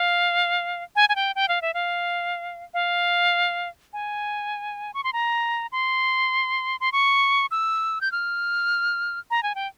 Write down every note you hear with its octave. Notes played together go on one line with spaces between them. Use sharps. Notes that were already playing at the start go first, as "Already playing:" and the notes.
Already playing: F5
G#5
G#5
G5
G5
F5
E5
F5
F5
G#5
C#6
C6
A#5
C6
C6
C#6
E6
G6
F6
A#5
G#5
G5